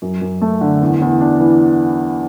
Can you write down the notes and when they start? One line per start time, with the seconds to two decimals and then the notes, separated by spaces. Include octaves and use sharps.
0.02 F#2
0.21 F#2
0.42 A3
0.61 D3
0.82 E2
1.02 E2
1.21 D4
1.40 E3